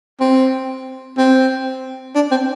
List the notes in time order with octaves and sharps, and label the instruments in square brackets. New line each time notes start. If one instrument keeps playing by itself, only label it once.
[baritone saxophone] C4
C4
D4
C4